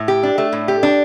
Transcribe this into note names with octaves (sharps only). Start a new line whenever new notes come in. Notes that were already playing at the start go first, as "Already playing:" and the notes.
Already playing: A2
G4
D4
A3
A2
G4
D4